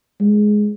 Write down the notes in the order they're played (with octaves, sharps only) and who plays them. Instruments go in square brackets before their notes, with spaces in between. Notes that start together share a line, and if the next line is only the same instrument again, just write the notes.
[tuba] G#3